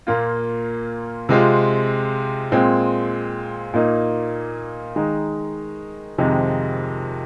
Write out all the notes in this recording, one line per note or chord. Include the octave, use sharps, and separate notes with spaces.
A#2 A#3 F4
C3 G#3 C4 F4
A#2 G#3 C4
A#2 A#3 D#4
D#3 G#3 D#4
F2 C3 D#3 G#3 D#4